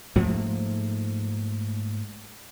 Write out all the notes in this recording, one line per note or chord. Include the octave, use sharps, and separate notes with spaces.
G#2 F3 A3 A#3